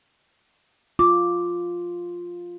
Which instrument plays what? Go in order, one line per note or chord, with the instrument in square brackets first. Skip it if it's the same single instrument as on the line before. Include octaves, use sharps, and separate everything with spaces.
[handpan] F4 [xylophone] D6